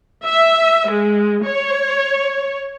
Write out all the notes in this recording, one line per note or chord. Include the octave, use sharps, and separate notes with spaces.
E5
G#3
C#5